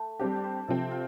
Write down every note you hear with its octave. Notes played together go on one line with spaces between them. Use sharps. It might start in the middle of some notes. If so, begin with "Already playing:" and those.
Already playing: A3
G3 C4 D4 G4
D5
C5
C3 F3 C4 A4
F4